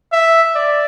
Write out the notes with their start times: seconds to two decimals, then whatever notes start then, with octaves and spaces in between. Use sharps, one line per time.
0.12 E5
0.55 D5